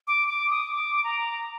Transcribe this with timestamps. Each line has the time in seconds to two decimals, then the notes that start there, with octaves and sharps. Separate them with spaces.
0.07 D6
0.28 D6
0.50 D#6
0.71 D6
1.04 A#5